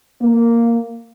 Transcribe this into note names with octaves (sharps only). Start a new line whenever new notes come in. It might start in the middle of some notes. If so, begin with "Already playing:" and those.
A#3